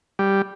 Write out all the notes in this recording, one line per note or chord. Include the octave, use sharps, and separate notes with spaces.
G3